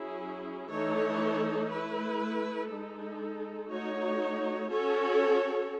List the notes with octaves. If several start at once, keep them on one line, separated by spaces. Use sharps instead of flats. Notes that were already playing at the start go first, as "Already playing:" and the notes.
Already playing: F#3 C#4 E4 G#4
E3 A3 D#4 A4 C#5
A3 E4 B4
G#3 D#4 A4
A3 D#4 F#4 C#5
C#4 F#4 A4 C#5